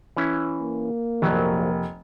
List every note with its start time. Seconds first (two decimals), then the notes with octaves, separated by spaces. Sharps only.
0.17 E3 C#4 E4
0.60 A#3
1.22 F1 A#1 F#3